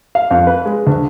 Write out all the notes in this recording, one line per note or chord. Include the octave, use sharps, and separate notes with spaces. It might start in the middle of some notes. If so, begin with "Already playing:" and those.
F5
F2
B4
G#3
D2